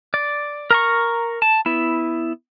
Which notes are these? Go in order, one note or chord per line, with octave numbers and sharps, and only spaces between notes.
D5
A#4 A#5 C#6
A5
B3 E4